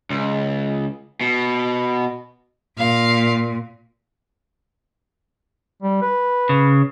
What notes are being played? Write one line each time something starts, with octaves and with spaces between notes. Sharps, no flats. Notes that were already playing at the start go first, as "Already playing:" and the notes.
C#2
B2
A#2 F5
G3
B4
C#3